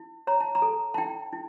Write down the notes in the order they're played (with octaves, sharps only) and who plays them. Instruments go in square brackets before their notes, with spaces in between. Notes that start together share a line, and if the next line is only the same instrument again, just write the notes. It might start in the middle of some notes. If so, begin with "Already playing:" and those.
Already playing: [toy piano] E4
C#5 A#5
A5
A#5
A4
A5
E4 G5
E4